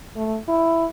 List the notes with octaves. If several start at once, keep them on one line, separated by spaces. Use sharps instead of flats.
A3
E4